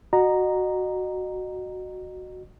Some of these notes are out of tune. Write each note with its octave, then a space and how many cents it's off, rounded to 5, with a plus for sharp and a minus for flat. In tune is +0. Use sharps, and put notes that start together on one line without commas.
F#4 +0 D#5 -30 A#5 +0